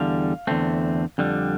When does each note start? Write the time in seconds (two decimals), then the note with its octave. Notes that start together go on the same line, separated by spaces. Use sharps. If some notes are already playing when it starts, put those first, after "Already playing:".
Already playing: E2 D3 G3 F5
0.47 E2 D3 A3 C4
1.18 F2 D3 G3